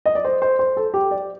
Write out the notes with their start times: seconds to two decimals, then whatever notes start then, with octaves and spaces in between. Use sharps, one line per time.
0.06 D#5
0.15 D5
0.25 C5
0.42 C5
0.59 C5
0.77 A4
0.94 G4
1.11 D5